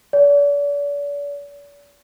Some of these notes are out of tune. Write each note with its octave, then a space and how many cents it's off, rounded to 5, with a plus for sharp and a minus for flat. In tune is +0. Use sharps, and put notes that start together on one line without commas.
D5 -40